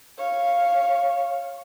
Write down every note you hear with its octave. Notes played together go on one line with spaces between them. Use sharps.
C#5 F5